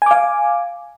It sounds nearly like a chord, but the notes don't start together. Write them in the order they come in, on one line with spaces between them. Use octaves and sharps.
G#5 D6 F5